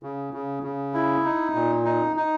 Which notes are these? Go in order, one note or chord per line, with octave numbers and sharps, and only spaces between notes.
C#3
C#3
C#3
E4
D#4
A#2
D#4
D#4